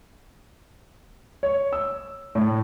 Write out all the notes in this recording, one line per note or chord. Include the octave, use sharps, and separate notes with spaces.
C#5
E6
A2